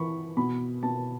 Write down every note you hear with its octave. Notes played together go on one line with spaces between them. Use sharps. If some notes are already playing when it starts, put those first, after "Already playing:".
Already playing: E3 B5 C#6
B2 B5
B2 A5